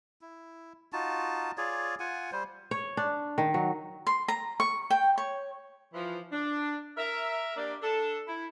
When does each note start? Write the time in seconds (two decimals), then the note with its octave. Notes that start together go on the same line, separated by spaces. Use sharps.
0.21 E4
0.93 D#4 F4 F#4 A5
1.58 F4 G#4 C#5 D5
2.00 F4 F#5 G#5
2.32 G3 C5
2.71 C#5
2.97 D4
3.38 D#3
3.54 F#3
4.07 C6
4.28 A#5
4.60 C#6
4.90 G5
5.18 C#5
5.93 E3 F3
6.32 D4
6.97 A#4 E5
7.56 A#3 D4 G4 D5
7.82 D4 A4
8.27 E4